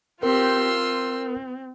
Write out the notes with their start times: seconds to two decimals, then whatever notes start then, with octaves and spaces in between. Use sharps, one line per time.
0.23 C4 F4 G4 A#4 C6 E6
0.75 C4